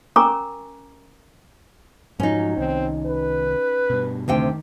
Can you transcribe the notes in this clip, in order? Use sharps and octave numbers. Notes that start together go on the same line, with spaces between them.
C#4 A#4 G#5 A#5 C#6 D6
G#2 F3 F#3 C#4 D#4
C2 D#3 C4
B4
G2 B2
D2 C3 D#3 G5